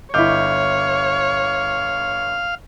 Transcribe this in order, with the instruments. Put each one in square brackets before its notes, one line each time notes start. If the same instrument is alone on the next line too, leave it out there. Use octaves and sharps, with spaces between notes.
[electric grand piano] G1 D6 G6 [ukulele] E4 D#5 [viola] C#5 [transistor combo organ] F5